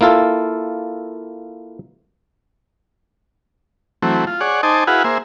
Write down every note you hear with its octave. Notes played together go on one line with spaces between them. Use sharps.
A#3 E4 F4 A4
E3 F#3 A3 C4
F4
G#4 C#5 D5 F#5
D#4 C5 D#5 G#5 A5 D6
E4 F#4 G#4 B4 F5 F#5
A#3 G#4 C5 E5